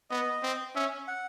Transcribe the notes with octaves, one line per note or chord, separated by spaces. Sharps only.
B3 D#5
C4
C#4 E5
F#5